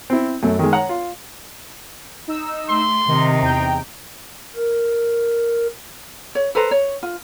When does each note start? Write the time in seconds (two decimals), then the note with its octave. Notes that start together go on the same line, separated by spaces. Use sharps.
0.10 C4 E4
0.43 F#2 A3
0.59 D#3 G#3
0.73 C#5 F#5 A#5
0.89 F4
2.28 D#4 E6
2.69 A3 C6
3.08 C3 D#3 D#4
3.42 E2 G5 A#5
4.56 A#4
6.35 C#5
6.55 A4 B4 C5 A#5
6.71 C#5
7.03 F4